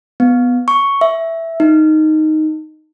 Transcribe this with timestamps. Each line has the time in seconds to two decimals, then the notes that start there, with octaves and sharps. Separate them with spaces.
0.20 B3
0.68 C#6
1.01 E5
1.60 D#4